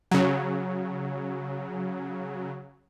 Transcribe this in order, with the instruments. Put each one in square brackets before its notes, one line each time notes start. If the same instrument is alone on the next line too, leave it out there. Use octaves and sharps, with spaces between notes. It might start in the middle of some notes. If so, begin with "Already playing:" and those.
[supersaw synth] C#3 F#3